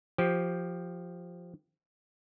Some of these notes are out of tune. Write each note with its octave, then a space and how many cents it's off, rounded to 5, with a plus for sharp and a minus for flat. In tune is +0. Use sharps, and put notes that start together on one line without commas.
F3 +0 G4 -10 C5 +5